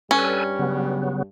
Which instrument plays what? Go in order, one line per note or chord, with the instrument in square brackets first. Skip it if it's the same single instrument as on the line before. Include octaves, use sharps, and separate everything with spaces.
[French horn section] G2 G3 [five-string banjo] C#4 [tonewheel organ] A4 B4 G#5
[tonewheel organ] C#3 F#3 B3